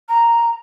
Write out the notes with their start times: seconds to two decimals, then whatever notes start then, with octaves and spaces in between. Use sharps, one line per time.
0.09 A#5